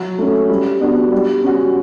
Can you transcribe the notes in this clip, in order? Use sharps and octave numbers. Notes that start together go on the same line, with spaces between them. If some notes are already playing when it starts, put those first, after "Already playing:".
Already playing: F#3
A3 C#4
G3
B3 D4 F#4
G3
C#4 F#4